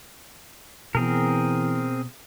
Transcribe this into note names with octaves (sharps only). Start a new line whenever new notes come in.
B2 E3 B3 C4 G#4 A#4